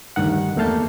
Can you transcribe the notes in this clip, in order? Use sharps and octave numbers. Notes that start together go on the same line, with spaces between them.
D2 G2 D#3 F#5
E2 A3 A#3 F5 A5 G6